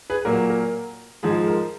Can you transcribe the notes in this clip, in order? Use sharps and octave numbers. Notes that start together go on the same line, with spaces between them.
G#4 B4
A#2 F#3 A#3 A#4
A#4
G#2 F3 G#3 G#4
A#4